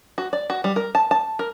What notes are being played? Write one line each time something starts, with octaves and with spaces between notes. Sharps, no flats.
F#4
D5
F#4
G3
A#4
A5
A5
A#4